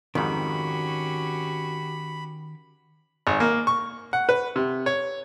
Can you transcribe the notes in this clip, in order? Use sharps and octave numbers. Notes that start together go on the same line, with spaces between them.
F2 G#2 D#3 C#4 F#4 G4 B5
G#1
A#3
C#6
F#5
B4
C3
C#5